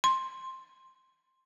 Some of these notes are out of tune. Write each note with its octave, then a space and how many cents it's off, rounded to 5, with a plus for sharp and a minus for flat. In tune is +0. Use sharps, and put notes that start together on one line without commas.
C6 +10